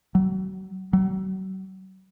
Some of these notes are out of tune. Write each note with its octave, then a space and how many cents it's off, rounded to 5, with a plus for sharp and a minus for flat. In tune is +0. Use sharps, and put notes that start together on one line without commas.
F#3 +30
F#3 +40